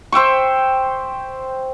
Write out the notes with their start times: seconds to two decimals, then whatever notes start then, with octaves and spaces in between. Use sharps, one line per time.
0.12 C5 E5 G5 C#6